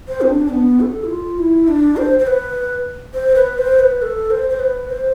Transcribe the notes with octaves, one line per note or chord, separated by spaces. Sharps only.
C5
C4
D4
B3
A4
E4
F4
E4
D4
C5
C5
B4
C5
B4
C5
B4
A4
C5
C5
B4
C5